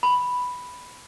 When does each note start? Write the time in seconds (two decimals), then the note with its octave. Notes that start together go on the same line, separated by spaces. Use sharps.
0.03 B5